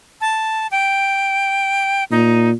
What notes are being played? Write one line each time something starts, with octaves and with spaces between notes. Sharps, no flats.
A5
G5
A#2 D#4